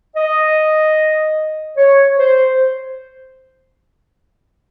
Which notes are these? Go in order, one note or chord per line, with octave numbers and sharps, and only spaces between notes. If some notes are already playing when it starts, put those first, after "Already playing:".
D#5
C#5
C5